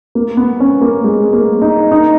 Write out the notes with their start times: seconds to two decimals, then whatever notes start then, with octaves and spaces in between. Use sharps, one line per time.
0.15 A#3
0.37 B3
0.60 C#4
0.82 A#3
1.04 G#3
1.33 A#3
1.62 D#4
1.92 D#4